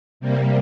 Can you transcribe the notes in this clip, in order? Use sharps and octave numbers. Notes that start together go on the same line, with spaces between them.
C3 G3 A#3